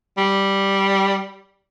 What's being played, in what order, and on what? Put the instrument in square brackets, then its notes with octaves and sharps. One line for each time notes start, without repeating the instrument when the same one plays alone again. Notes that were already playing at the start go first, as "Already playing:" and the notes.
[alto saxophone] G3